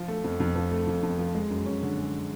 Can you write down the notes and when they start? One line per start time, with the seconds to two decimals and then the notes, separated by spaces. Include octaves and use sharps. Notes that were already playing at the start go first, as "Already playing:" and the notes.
Already playing: F3
0.08 A3
0.24 F2
0.40 F2
0.56 F3
0.72 A3
0.87 F2
1.03 F2
1.19 F3
1.35 G#3
1.50 F#2
1.66 C#4
1.83 D3
1.98 G#3